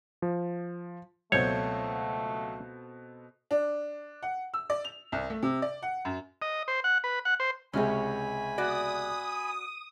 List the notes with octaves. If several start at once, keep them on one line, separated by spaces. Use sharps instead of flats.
F3
C#2 B2 F#3 A3 C4 A4 C#5 G6
D4
F#5
E6
D5
F7
C2
A3
C3
D5
F#5
F#2
D#5
C5
F#5
B4
F#5
C5
C#2 C3 G#3 C#4 C#5 G#5 B5
B3 F#4 D5 D#6